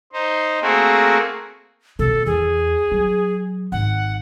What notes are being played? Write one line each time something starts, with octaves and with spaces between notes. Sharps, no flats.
D#4 C5
A3 A#3 C4 F#4 G#4 A#4
B2 B3 A4
E2 G#4
F#3
G#1 F#5